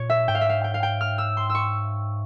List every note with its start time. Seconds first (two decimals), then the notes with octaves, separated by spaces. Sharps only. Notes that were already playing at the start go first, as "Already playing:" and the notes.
Already playing: A#2 C#5
0.10 E5
0.28 G#2 G5
0.35 F5
0.41 E5
0.49 F5
0.64 G5
0.74 F5
0.83 G5
1.01 F6
1.18 E6
1.37 C6
1.50 E6
1.55 C#6